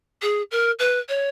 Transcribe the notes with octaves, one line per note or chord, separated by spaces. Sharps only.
G#4
A#4
B4
C#5